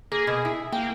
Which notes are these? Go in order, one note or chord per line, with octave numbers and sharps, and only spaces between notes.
A#3 G#4
B2
E4
A#3 G5